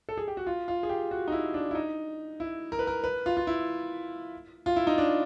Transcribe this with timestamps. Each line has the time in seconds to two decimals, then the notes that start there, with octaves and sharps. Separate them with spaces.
0.09 A4
0.18 G#4
0.28 G4
0.37 F#4
0.47 F4
0.68 F4
0.83 G#4
0.89 G4
1.11 F#4
1.28 D#4
1.32 E4
1.54 D4
1.71 E4
1.75 D#4
2.40 E4
2.72 A#4
2.79 B4
2.87 A#4
3.04 B4
3.26 F4
3.37 F4
3.47 E4
4.66 F4
4.76 E4
4.87 D#4
4.98 D4